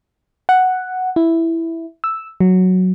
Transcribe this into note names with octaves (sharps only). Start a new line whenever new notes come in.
F#5
E4
E6
F#3